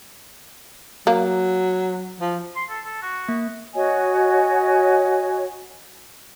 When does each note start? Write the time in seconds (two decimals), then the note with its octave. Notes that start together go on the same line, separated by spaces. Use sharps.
1.07 F#3 A#3
2.20 F3
2.56 C6
2.69 A4
2.85 A4
3.02 F#4
3.29 A#3
3.75 F#4 C#5 D#5 G#5